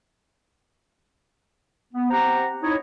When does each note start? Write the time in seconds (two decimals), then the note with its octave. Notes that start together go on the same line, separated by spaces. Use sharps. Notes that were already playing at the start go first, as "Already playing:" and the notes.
1.93 B3
2.10 C4 G4 C5 F#5 A#5
2.62 D#4 E4 C#5